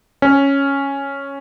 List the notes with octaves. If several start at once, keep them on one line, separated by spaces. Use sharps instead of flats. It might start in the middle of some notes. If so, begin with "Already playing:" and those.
C#4